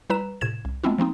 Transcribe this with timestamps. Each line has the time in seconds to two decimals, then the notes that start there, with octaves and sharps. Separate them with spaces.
0.10 G3 E4 B4 A#5 E7
0.41 A2 C3 G#6 E7
0.65 C2
0.84 G#3 A3 B3 C4 E4 F4
0.98 F3 A#3 C4 D#4